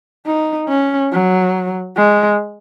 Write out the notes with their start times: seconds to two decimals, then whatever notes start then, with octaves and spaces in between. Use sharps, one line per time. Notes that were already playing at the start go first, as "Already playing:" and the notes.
0.27 D#4
0.69 C#4
1.12 F#3
1.97 G#3